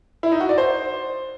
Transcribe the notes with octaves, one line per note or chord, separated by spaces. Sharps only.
E4
D#4
F#4
D5
C5